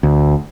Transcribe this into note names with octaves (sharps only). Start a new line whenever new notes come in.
D2